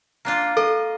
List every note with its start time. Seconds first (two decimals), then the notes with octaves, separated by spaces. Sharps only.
0.25 A#3 D4 F4
0.57 A4 D#5